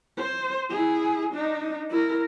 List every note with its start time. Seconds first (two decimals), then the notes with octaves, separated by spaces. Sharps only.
0.17 C5
0.70 E4 G#4
1.32 D4 D#4
1.90 E4 A#4